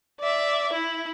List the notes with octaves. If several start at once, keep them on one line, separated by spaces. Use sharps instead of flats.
D5 E5
E4